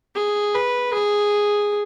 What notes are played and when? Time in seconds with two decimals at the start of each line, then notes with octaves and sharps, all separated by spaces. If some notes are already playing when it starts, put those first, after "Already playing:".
0.16 G#4
0.55 B4
0.94 G#4